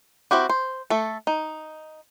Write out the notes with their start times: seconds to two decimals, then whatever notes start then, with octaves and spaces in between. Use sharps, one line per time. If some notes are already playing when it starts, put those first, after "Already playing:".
0.31 C4 E4 F#4 G4
0.49 C5
0.90 A3 A4
1.27 D#4